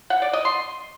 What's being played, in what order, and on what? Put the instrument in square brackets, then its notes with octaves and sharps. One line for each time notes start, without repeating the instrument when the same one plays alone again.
[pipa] F#5
D5
D#5
C6